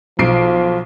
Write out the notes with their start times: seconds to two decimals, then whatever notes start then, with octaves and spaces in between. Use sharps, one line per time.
0.19 B1 F3 C7 D7